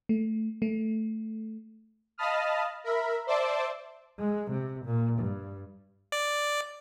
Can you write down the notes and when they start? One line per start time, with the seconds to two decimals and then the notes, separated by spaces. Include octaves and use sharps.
0.09 A3
0.62 A3
2.18 D#5 F5 A5 B5 D#6 F6
2.84 A#4 E5 B5
3.27 C5 D5 E5 A5 D6
4.19 G#3
4.51 C3
4.85 A#2
5.19 G2
6.12 D5